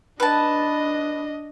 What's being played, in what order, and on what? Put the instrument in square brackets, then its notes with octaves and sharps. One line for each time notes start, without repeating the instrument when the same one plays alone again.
[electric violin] D4 D#5 [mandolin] B4 A5